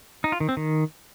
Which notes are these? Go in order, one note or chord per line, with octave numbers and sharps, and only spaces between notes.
D#4
F4
D#3
C4
D#3